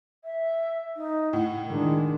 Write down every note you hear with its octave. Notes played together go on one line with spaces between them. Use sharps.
E5
D#4
A2 F#5
D#3 G#3 D4